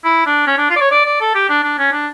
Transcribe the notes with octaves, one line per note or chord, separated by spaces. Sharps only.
E4
D4
C#4
D4
F4
D5
C#5
D5
D5
A4
G4
D4
D4
C#4
D4